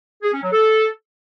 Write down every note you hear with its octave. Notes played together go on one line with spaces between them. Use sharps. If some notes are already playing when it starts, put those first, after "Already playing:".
G#4
C#4
F#3
A4